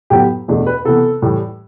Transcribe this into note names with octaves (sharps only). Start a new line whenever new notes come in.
A2 F#3 B3 G4
E2 B2 A3 D4
B4
C3 E3 B3 A4
A2 E3 G3